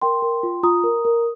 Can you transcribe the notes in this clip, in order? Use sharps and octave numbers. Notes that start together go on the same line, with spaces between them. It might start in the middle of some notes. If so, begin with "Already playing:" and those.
A#4 G5 C6
A#4
F4
F4 A#5 D#6
A#4
A#4